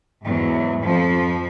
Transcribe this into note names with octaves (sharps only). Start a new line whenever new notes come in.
E2 G#2 F#3
F2 F3